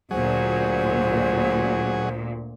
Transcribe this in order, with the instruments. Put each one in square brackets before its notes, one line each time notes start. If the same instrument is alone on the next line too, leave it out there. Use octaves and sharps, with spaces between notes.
[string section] D2 A#2 [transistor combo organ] F#3 G#4 [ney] C5